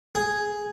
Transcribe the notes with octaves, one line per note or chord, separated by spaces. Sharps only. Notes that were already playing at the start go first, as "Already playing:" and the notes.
G#4